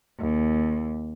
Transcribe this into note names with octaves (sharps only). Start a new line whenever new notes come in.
D#2